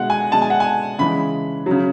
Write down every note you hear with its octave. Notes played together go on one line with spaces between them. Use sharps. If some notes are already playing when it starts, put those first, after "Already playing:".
Already playing: B2 G#3 F#5
G#5
B2 G#3 A5
G#5
F#5
G#5
C#3 E3 G#3 B5
C#3 F#3